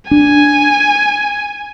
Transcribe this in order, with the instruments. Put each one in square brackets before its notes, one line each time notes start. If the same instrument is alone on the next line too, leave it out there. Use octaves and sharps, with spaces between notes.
[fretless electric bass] D4 [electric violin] G#5